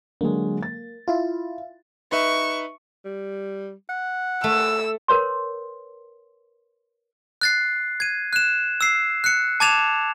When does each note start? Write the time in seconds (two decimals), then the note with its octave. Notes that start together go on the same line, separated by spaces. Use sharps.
0.21 D3 F#3 G#3 A#3
0.63 A6
1.08 E4 F4
2.12 D#4 B4 E5 C#6
3.05 G3
3.89 F#5
4.44 A3 E6
5.08 A#4 B4 C#5 C6
7.41 F#6 A6 C7
8.00 G#6 D#7
8.33 F#6 E7
8.81 E6 C7
9.24 F#6 C#7
9.60 A5 D6 G#6 A6 E7 F7